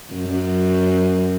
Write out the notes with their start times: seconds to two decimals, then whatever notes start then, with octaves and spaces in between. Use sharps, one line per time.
0.13 F#2